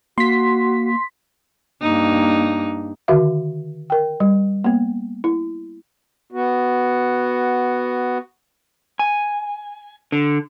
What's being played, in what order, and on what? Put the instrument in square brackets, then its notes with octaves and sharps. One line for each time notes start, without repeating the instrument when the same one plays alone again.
[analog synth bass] A#3 [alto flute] F#4 [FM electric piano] C6 B6
[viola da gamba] G2 A#3 D#4
[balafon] D3 D#3 F#4 E5 F5
A#4 G5
G3
A#3 B3
E4
[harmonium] B3 F#4
[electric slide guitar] G#5
D3